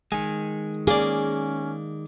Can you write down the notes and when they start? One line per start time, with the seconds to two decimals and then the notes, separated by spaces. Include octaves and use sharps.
0.12 D#3 G#3 G#5
0.87 A#3 C#4 G#4 D5